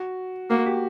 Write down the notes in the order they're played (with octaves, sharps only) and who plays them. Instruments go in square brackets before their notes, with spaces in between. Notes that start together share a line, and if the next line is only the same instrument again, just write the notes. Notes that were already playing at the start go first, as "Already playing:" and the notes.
Already playing: [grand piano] F#4
[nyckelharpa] A#3 [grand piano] F#4
[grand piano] G4